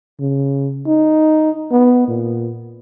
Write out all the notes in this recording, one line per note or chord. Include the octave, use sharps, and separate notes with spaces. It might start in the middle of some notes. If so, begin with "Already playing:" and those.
C#3
D#4
B3
A#2